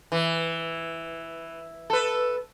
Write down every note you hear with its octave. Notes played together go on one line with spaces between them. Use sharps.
E3
A4 B4